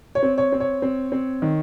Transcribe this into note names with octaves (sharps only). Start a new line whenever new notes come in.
C#5
C4
C#5
C4
C#5
C4
C4
D#3